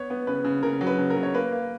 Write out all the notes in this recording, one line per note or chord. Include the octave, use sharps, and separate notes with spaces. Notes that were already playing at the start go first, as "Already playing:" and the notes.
Already playing: B3 C#5
B3
C#3 B4
C#3
C#3 A#4
F#3
B4
C#3
A#4
C#3
C#5
A#3 B4
A#3